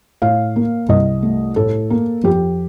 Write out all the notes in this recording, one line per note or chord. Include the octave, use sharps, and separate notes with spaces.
A2 F5
A#3
C2 D#5
A3
A2 A4
A#3
F2 G4